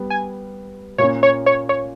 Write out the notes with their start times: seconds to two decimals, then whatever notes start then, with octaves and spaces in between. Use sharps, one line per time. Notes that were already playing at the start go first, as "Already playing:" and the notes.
Already playing: G3 B3 G4
0.10 G#5
0.98 A#2 A#3 C#4 C#5
1.23 C#5
1.46 C#5
1.69 C#5